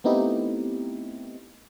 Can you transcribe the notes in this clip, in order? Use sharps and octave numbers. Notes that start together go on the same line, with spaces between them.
A3 B3 C4 D#4 E4 G4